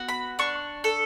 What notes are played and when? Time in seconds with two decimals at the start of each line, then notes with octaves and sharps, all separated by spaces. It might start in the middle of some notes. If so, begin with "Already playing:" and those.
Already playing: B3 F#4
0.08 B5
0.39 D4 C#6
0.84 A4